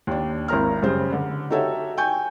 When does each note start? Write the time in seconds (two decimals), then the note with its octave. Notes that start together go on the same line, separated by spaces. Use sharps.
0.07 D#2 D4
0.48 G#1 E4 A#4 A#5 F6
0.83 F#2 C#3 G3 C5
1.12 D3
1.50 D#4 F#4 G4 A4 C#5 E5
1.97 G5 G#5 C#6 G6